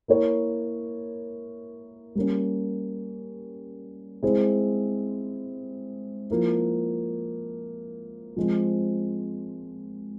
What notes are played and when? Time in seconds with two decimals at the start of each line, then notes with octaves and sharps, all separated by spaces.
0.08 A#3 E4 A#4 C#5
2.15 G3 A#3 C#4
4.23 G#3 C4 E4 G#4 C5
6.30 F3 A#3 E4
8.37 F3 G#3 C4